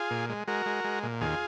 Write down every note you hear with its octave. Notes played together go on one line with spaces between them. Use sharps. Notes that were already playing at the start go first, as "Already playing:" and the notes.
Already playing: F4 G#4
A#2
G#3
G#3 F#4 A#4
G#3
G#3
A#2
D#2 F4 G#4